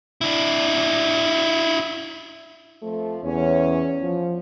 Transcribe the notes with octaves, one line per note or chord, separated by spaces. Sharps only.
D4 E4
F2 F3 A3
E2 C#4 C#5
F3